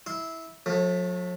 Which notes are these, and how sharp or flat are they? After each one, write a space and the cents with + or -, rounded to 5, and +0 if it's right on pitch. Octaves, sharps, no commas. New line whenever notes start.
E4 -15 C6 -15
F#3 -45 A3 +0